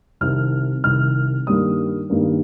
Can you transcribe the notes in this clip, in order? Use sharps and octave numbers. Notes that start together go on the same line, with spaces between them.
C2 C3 D#3 F6
C2 C3 D#3 F6
G2 D#3 G3 A#3 D#6
G2 D#3 G3 A#3